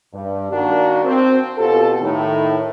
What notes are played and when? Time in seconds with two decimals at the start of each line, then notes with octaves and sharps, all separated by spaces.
0.13 G2
0.51 D#3 A#3 D4 F#4
1.04 C4
1.58 B2 F4 G4 A4
2.01 A2 D#3 A3